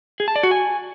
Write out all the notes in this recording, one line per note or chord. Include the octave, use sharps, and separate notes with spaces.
G#4
A5
D5
F#4
G#5